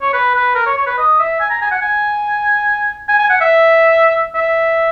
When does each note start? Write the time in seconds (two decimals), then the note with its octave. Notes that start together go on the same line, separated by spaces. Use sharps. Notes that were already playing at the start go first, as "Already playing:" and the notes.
0.02 C#5
0.13 B4
0.35 B4
0.55 A#4
0.66 C#5
0.77 C#5
0.87 B4
0.98 D#5
1.19 E5
1.40 G#5
1.50 A#5
1.61 G#5
1.71 F#5
1.82 G#5
3.09 G#5
3.19 G#5
3.30 F#5
3.41 E5
4.35 E5